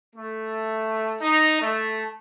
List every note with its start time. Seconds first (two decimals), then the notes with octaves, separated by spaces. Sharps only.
0.15 A3
1.20 D#4
1.60 A3